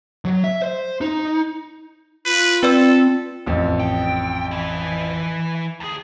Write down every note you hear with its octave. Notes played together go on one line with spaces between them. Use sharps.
F#3
E5
C5
D#4
F4 B4
C4 A4 B4 D5 E6
A1 F2
G5
E3 E4
D2 G#4